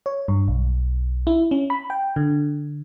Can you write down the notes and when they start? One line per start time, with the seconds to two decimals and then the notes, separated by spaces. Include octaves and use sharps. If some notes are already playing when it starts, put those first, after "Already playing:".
0.06 C#5
0.28 G2
0.48 B1
1.27 E4
1.51 C#4
1.70 B5
1.90 G5
2.16 D3